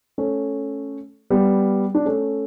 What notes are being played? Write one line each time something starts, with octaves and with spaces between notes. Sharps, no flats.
A3 C#4
G3 B3
D4
A3 C#4